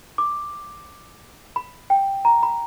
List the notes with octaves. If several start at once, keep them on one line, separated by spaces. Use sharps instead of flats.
D6
B5
G5
A#5
B5